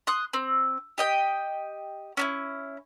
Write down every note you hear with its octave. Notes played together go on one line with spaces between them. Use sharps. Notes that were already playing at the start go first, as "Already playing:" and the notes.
C6 D#6 F#6
C4
G4 D#5 G5
C#4 D4 E4